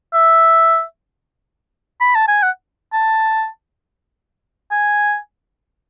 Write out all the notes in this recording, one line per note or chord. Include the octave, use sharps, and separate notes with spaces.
E5
B5
A5
G#5
F#5
A5
G#5